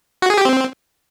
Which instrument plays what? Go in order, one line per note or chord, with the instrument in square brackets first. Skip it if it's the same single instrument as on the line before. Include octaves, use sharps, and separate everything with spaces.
[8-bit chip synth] F#4
G#4
G4
C4